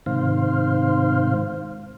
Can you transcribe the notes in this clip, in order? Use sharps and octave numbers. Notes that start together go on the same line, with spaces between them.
G#2 C3 D#3 C5 F5